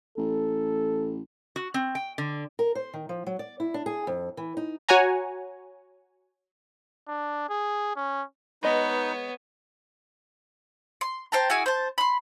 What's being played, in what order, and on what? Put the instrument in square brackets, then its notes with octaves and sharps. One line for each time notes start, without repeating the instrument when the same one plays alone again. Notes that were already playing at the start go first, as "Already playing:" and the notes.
[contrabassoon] A1 [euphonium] A4
[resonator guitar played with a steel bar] F#4
C4
G5
D3
[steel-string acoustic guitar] A#4
C5
D#3
F3
F#3
D5
E4
D4
G#4
F2
E3
D#4
[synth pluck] F#4 C#5 F#5 G#5 A#5
[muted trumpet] D4
G#4
C#4
[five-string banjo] G#3 D#5 [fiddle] B3 C#5 [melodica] D#4 B4
[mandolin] C6
C5 G5 A5 A#5
E4 F#4 G#4 G#5
C5 A5
B5 C6